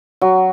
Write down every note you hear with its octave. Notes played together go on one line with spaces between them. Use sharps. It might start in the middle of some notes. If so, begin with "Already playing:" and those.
F#3